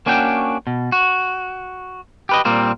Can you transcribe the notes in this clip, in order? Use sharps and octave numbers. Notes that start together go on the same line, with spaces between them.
A#3 C#4 D4 F#4 G5
B2
F#4
G4 B4 D#5
A#2 G3 A#3 C4